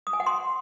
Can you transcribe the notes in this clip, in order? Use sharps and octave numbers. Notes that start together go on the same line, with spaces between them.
D#6
G#5
F#5
C6